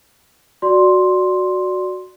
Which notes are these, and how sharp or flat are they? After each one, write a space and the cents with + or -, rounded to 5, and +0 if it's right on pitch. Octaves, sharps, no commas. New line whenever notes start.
F#4 +0 D5 +0 C6 +0